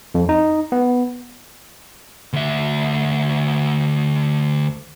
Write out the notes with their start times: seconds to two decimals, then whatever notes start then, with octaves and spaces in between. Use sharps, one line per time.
0.15 F2
0.29 D#4
0.72 B3
2.33 D2 E5